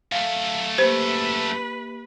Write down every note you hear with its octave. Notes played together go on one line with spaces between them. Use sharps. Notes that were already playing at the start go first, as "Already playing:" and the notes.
F#2 A3 F5
A#3 G4 B4 C5